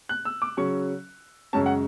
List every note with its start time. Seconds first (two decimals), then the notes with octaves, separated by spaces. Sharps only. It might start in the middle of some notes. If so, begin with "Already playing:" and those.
0.09 F#6
0.25 E6
0.42 D6
0.57 C#3 F#3 C#4 C#6
1.53 F#2 C#3 G#3 C#4 A5
1.66 F#5